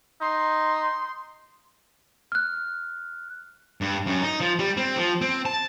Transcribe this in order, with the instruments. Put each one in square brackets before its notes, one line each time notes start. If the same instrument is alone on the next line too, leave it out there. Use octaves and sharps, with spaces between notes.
[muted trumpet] D#4 [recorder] C6
[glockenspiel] F6 F#6
[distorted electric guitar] G2
F#2
D#4
F3
G3
C4
F3
C4
A5